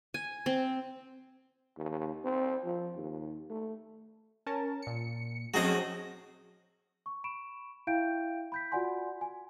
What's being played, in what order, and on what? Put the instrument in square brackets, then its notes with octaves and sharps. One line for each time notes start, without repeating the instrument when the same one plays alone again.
[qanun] G#5
C4
[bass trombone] D#2
C4
F3
D#2
A3
[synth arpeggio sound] C#4 A#4 A5
A#2 C#7
[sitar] F2 A3 G#4 [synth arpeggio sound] F#3 C4 [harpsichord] F#4 D#5
[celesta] C#6
B5 C#6 D7 E7
E4 E5 F5 G5 G6 D7
B5 G6 B6
F4 F#4 D5 F#5 G#5 C6
G#5